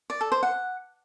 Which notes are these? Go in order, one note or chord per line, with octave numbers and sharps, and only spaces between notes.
D5
A4
C5
F#5